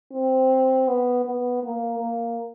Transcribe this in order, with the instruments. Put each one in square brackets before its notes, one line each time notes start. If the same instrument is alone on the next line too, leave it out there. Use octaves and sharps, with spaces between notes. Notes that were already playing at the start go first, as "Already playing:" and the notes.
[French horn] C4
B3
B3
A#3
A#3